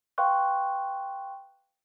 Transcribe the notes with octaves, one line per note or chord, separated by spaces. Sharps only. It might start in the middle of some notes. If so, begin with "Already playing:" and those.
B4 F5 G5 C6 C#6 F#6